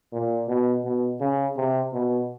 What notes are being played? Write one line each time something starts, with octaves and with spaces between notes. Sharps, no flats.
A#2
B2
B2
C#3
C3
B2